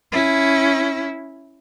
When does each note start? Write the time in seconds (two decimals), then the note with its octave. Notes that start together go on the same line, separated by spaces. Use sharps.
0.12 C#4 E4